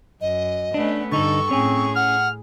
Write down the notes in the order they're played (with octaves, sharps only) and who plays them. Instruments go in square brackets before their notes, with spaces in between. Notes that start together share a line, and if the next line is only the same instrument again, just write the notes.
[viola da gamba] F#2 [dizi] D#5
[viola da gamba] A3 B3 C#4 [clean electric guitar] D4
[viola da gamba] G2 A4 [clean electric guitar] D3 D#4 [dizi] C#6
[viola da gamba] A2 G#4 [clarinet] C4 [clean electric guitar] C#4
[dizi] F#5 [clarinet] F6